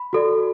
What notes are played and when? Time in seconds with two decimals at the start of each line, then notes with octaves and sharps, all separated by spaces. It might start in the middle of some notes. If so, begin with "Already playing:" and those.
Already playing: B5
0.13 F#4 A4 D5